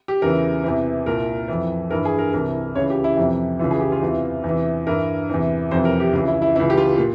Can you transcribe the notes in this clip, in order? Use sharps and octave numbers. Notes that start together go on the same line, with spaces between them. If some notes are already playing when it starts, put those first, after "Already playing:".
G4
E2 C#3 E3 A#4
E2 C3 E3
C2 A#2 A#4
F2 E3
G2 E3 A#4
G#4
A#4
C2 C3 E3 A#4
C#2 C#3 E3 C#5
G4
E4
F2 C3 E3
C#2 C#3 E3 F4
G#4
G4
F4
E2 C3 E3
E2 C3 E3
G2 E3 A#4
E2 C3 E3
F2 C3 E3 C5
A#4
G4
C#2 C#3 E3
E4
E4
C#2 C#3 E3 E4
G4
F4
A#2